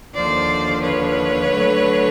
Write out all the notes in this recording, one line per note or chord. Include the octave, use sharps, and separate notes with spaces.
D#2 D3 F3 C5 D5
B4 C#5
D3 F#3 A3